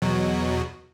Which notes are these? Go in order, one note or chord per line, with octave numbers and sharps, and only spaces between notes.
E2 B2 F#3